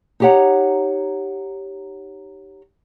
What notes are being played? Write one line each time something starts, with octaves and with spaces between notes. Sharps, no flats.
D#4 E4 G4 C#5 F#5 A#5